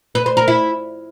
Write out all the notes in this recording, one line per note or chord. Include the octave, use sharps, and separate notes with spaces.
B4
C5
A#4
E4